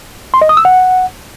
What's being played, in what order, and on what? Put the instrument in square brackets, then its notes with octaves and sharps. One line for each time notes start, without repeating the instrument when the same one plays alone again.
[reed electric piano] C6
D#5
D#6
E6
F#5